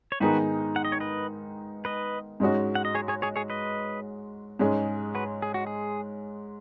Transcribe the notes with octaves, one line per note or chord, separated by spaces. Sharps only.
C#5
G#2 D#3 B3 D#4 F#4 G#4 B4
F#5
D#5
C#5
B4 D#5
B4 D#5
G#2 G#3 C#4 F#4
F#5
D#5
G#4 C#5
G#4 C#5
G#4 C#5
G#4 C#5
B4 D#5
G#2 G#3 C#4 G#4
F#4 B4
G#4
F#4
G#4